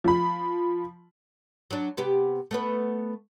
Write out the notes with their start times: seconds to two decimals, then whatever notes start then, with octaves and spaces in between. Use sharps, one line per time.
0.04 F3 B5
1.71 F#3 D4
1.97 C3 B3 G4
2.51 A3 B3 B4